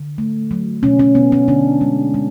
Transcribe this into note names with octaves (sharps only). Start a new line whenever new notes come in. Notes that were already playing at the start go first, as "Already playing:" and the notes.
Already playing: D3
A3
F#3
B2 C#4
C#4
B2 B3
C#4
D3 D4
G#3
G#3